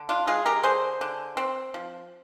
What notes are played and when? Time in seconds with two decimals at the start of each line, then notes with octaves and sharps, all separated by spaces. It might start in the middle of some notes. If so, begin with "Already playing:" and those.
Already playing: D3
0.09 D4 F4
0.27 G#3 F4 G#4
0.46 G4 A#4
0.63 D3 G#4 C5
1.01 D3
1.37 C4
1.74 F3